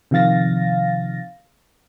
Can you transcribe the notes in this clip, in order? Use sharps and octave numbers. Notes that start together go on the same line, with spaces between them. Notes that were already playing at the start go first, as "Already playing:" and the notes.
C3 D#3 F3 F5 A6 A#6